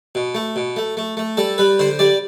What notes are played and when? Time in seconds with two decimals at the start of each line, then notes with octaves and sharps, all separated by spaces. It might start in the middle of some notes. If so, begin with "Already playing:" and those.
0.15 B2
0.35 A3
0.56 B2
0.76 A3
0.97 A3
1.17 A3
1.37 G3 A4
1.58 G3 B4
1.79 D3 C5
1.99 G3 D5